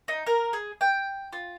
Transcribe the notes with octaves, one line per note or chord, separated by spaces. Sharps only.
D#4
A#4
G#4
G5
F4